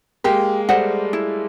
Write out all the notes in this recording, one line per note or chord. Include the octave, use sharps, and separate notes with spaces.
G#3 A#3 G4
G3 A3 C5 D#5 F#5
E4